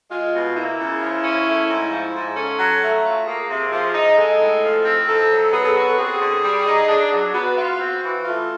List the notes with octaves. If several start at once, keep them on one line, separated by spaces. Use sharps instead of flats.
G#3 F4
B2
A#3 E4
C#3
F3
C#4
A3
G#2
F3
G#2
C#4 A4
F#3
A3
F4
A#3 G#4
C3
F3
D#4
G#3 A4
A2
F3
C4
D#4 A4
F#3
B3 G#4
A4
F#4
A4
C4 G#4
D3
G3
D#4
D4
F#3
B3 F#4
F4
C4
E3
A3 F4